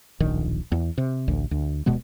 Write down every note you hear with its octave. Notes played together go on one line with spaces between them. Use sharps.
D1 A#1 D#3
E2
C3
A1 D2
D2
D1 B2 G#3 B3